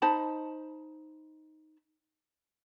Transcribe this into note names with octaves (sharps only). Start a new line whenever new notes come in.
D#4 C5 A5 B5